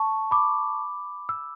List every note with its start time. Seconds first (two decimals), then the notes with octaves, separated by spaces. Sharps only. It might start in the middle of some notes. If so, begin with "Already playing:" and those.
Already playing: A5 C#6
0.31 B5 D6
1.29 E6